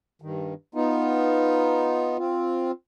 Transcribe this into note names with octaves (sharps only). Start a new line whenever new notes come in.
G2 D#3
B3 D#4 F4
C4 F4